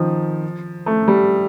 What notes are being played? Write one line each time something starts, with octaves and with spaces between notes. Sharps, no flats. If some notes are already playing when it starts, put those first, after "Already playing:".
Already playing: D#3 F3
A3
G3